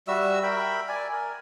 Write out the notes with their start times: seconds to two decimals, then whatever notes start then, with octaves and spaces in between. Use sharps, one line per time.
0.08 G3 F#4 E5 E6
0.43 A#4 E5 G5 B5
0.88 D5 G#5
1.13 A#4